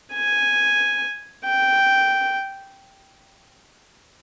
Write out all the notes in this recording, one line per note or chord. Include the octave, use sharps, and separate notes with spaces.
G#5
G5